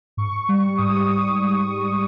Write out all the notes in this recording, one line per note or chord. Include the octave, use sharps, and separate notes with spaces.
G#2 C#6
G3 C#6
G#2 D#6
G3 D#6